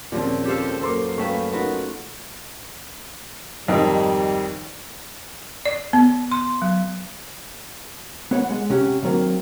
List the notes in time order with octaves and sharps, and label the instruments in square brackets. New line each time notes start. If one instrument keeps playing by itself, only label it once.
[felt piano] D#2 F3 C4 [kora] A#2 C#3
[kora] G4 F5 [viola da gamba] A4 C5
[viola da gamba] F#2 A#3 [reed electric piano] A4 D6 [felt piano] A#4 C5 C6
[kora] A3 E5 [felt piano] C#4 B4 [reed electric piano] F5 G5 C#6
[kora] B3 F4 F#4 [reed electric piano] D#4 A#4
[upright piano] F2 G#2 D#3 [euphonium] G3
[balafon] D5
B3
C6
F#3
[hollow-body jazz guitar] B3 C#5 F#5
G#3 F#5
C3 C#4 G4 F#5
D3 D#3 F#3 A#3 C4